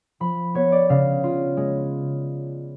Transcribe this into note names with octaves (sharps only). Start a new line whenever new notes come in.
F3 B5
B3 C#5
D5
C#3 F5
F4
G#3